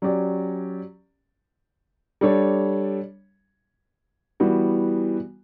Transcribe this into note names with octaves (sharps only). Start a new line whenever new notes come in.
F#3 C#4 G4 D5
G3 D4 A4 C#5
E3 G3 B3 F#4